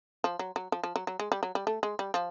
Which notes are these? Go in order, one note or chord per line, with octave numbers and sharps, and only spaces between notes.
F3
F#3
F#3
F3
F3
F#3
F#3
G#3
G3
F#3
G3
A3
G#3
G3
F3